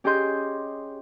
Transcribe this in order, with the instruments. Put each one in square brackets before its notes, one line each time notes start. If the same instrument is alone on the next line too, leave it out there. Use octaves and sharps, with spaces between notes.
[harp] C#4 G4 G#4 D#5 C6 G6